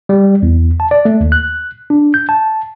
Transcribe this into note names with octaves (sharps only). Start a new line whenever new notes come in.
G3
E2
A5
D5
A3
D#2
F#6
D4
G6
A5